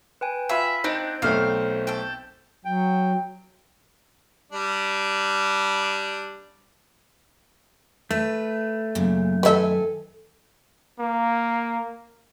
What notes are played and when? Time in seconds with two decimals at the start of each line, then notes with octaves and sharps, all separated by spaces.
0.21 B4 G5 G#5
0.49 F4 E5 F5 G#5 B5 E6
0.84 C4 D4 D#4 C5 F#5 D7
1.22 B1 A3 C4 F5
1.87 A4 G5
2.65 F#3 G5
4.52 G3 D4
8.11 A3 B4
8.95 F#2 A#2 C#3
9.43 D#3 A4 B4 E5 G#5
11.00 A#3